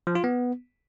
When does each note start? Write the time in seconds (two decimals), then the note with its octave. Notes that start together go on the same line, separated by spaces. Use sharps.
0.07 F3
0.15 F4
0.24 B3